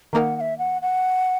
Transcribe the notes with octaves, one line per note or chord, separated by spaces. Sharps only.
D#3 A#3 D#4 A#4 F#5 A#5
F#5
E5
F#5
F#5